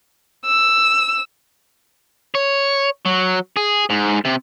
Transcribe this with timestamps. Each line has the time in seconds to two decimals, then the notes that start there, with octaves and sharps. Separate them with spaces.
0.45 E6
2.35 C#5
3.06 F#3
3.57 G#4
3.90 G#2
4.25 C3